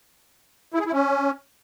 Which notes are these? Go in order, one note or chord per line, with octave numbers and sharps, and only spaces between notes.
E4
G#4
E4
C#4